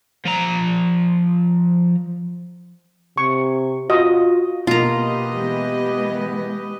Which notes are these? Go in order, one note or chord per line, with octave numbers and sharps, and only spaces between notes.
F3 A#5
C3 C#6
F4 F#4 D#5
B2 A#3 F4 G4 B4 D#5 A#5
E3 G#3 B3